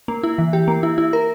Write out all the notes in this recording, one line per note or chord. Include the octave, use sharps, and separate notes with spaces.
A#3
E4
E3
G4
A#3
E4
E4
A#4